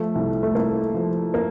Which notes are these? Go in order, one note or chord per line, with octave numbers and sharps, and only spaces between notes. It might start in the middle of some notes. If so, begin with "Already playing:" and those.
Already playing: F3 A3
C2
A3
C2 A#3
F3
A#3